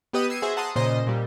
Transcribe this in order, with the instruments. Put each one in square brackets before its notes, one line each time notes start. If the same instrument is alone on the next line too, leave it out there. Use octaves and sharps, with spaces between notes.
[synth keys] B3 G4 B4 D#5 D#6 D#7
D#6 E6 G#6 C7 C#7 D#7
F#4 G#4 C5 E5
F#5 A5 A#5 C6 D#6
A#2 C#3 C5 D#5 C6 A#6
A#2 G3